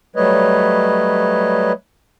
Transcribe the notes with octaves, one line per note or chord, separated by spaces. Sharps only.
F#3 G3 A3 B4 C#5 D#5